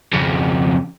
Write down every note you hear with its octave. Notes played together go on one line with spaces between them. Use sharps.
F2 C#3